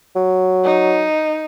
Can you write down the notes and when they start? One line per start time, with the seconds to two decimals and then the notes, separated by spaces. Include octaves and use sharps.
0.16 F#3
0.64 D#4